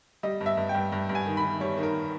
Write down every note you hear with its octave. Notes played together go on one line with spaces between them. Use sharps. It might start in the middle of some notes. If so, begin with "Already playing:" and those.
G3 D#5
G2
E5
G2
G5
G2
G2
G2
G#5
D#3
B5
D#3
G3 C#5
D#3
A#4